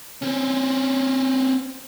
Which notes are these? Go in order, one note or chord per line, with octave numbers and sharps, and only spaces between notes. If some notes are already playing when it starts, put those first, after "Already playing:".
C4 C#4